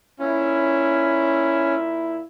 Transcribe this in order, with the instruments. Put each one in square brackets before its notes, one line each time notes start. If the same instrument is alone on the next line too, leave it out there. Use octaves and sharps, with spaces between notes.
[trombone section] A#2 E4 [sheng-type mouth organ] C#4